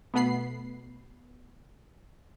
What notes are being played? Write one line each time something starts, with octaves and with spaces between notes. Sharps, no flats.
B2 A3 B3 B5 C7